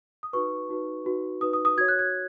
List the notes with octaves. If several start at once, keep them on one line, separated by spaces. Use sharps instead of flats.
D#6
D#4 F#4 B4 C#6
D#4 F#4 B4
D#4 F#4 B4
D#4 F#4 B4 D#6
D#6
D#6
F#4 C#5 G#6
F#6
G#6